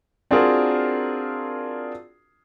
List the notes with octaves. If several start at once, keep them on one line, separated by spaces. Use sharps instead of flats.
C4 D4 F4 F#4 G#4 A#4